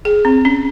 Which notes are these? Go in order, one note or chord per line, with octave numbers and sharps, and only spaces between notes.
G#4
C4
C#4